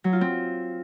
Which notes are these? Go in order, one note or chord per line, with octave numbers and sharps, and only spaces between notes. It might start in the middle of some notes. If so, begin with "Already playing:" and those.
F#3
F4
C4